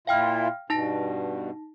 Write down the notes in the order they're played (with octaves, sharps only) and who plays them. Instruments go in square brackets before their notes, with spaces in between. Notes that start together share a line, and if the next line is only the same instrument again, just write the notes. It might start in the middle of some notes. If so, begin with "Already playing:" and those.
[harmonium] A#2 E4 F4 [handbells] F5 G5 F6
[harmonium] G2 B2 [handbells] D#4 A5 A#6